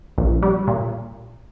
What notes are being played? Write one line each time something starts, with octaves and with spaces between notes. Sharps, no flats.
A#1
G3
A#2